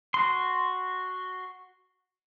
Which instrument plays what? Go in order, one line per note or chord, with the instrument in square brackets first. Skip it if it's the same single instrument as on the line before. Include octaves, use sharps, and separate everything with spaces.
[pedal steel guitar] F#4 C6